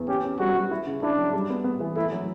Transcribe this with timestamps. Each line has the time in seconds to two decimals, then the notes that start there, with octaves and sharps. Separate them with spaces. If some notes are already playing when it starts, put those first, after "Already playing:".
Already playing: E2
0.08 C#4 G4
0.24 C#4
0.39 G3 F#4
0.55 G3
0.71 E4
0.87 C#3
1.02 D4 E4
1.19 F#3
1.33 G3
1.50 B3
1.64 B3
1.80 E3
1.96 A3 E4
2.12 F#3